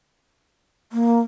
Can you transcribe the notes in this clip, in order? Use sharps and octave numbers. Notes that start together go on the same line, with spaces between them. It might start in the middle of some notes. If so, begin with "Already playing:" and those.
A#3